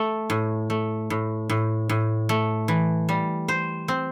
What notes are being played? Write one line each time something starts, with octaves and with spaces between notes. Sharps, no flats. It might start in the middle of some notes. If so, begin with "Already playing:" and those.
Already playing: A3
A2
A3
A2
A2
A2
A3
E3
G3
C5
C4